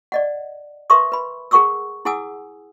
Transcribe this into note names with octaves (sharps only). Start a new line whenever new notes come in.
D5 D#5 F#5
A#4 B4 E5 C6 C#6 D#6
B4 B5
G#4 A#4 F#5 C#6 D#6 E6
E4 G#4 F#5 G#5 D#6 E6